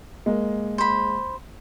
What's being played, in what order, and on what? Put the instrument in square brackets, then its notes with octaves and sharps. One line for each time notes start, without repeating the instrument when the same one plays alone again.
[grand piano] G#3 A#3
[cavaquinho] C5 B5